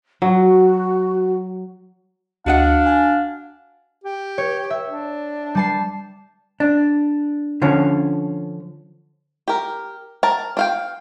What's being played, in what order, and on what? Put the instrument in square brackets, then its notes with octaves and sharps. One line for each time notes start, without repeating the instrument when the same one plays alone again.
[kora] F#3 [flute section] F#4
[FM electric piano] D2 [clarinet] D4 [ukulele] F#4 D#5 F#5 [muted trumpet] F5
[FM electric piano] G#5
[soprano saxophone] G4
[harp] C#5
E5
[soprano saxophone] D4
[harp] G3 A5 C7
[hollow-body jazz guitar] D4
D3 F3 C#4
[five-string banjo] G4 A#4
A#4 A5
D4 F5 G5